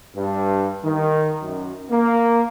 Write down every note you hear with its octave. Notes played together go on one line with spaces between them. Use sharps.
G2
D#3
F#2
A#3